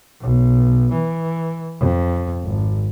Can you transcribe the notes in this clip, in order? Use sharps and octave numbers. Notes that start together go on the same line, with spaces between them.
B1
E3
F2
G#1